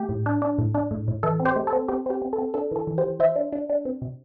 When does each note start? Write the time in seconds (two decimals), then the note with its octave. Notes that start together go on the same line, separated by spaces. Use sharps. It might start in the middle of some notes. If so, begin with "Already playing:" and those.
Already playing: A3 G4
0.09 A2
0.26 D4
0.42 D4
0.58 A2
0.75 D4
0.91 A2
1.08 A2
1.23 E3 A4
1.40 C4
1.45 G4 C5
1.56 A3
1.67 A4
1.73 C4
1.88 C4 G4
2.06 C4 G4
2.22 C4
2.33 A4
2.38 C4
2.54 D4 A4
2.71 E3 A4
2.87 E3
2.98 G4 C5
3.04 E3
3.19 E3 C5 E5
3.36 D4
3.52 D4
3.69 D4
3.85 C4
4.02 C3